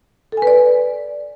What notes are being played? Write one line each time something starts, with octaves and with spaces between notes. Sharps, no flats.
A4 B4 D5 G#5